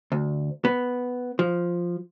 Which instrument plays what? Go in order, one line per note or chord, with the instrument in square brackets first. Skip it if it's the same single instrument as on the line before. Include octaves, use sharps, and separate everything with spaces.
[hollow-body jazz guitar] D2
B3
F3